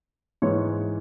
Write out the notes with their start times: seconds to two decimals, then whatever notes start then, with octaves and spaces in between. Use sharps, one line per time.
0.42 G#2 E3 G#3 C#5